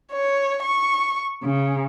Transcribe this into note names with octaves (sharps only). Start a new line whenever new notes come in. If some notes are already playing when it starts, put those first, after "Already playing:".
C#5
C#6
C#3